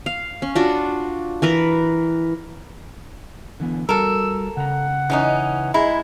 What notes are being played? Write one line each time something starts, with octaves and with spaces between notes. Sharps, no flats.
F5
C#4
D4 F4 F#4
E3 A#4 B4
D3 E3 B3
G3 F#4 A4 A#4 E6
C#3 F#5 A#5
E3 C#4 D#4
G#3 E4 A#5 B5